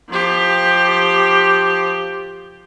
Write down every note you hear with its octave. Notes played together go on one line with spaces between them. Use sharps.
F3 G4